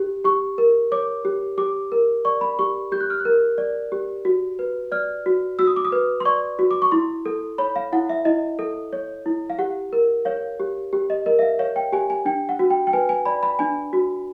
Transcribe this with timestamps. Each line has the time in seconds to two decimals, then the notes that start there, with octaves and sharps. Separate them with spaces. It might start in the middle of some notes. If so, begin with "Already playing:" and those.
Already playing: G4
0.24 G4 C#6
0.58 A#4
0.92 C#5 D6
1.25 G4
1.58 G4 D6
1.92 A#4
2.25 D5 C#6
2.41 B5
2.59 G4 C#6
2.92 G4 G6
3.01 F#6
3.10 F6
3.20 F#6
3.25 A#4
3.58 D5
3.92 G4
4.25 F#4
4.59 B4
4.92 D5 F6
5.26 F#4
5.59 F#4 E6
5.67 D#6
5.76 D6
5.85 D#6
5.92 B4
6.20 C6
6.25 D5 C#6
6.59 F#4
6.71 D6
6.82 C#6
6.92 E4 C6
7.26 A4
7.58 C#5 B5
7.76 F5
7.93 E4 F#5
8.10 E5
8.25 E4 D#5
8.59 A4
8.93 C#5
9.26 E4
9.50 F5
9.59 G4 F#5
9.93 A#4
10.25 C#5 F5
10.60 G4
10.93 G4
11.10 D#5
11.26 A#4 D#5
11.39 E5
11.42 F5
11.59 C#5 F5
11.76 G5
11.92 G4 G#5
12.10 G#5
12.25 D4 G5
12.49 F#5
12.59 F#4
12.70 G5
12.87 G5
12.93 B4 G#5
13.09 G#5
13.26 D5 B5
13.43 B5
13.59 D4 G#5
13.93 F#4